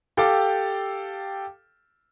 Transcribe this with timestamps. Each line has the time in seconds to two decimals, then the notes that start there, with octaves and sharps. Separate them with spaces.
0.17 G4 A4 F5 G5 D6